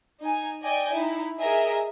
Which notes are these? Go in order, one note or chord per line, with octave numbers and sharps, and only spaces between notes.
D#4 G#5
D5 D#5 G5 G#5
D#4 E4
G#4 A#4 D#5 E5